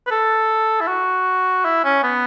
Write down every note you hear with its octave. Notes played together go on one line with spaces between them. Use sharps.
B4
A4
E4
F#4
E4
C#4
B3